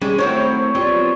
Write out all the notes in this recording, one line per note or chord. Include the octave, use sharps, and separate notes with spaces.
G3 G#3 C#4 D4
D#3 F#3 A3 C4 E4 C5 C#5 G5
F#3 G3 B3 C4 F4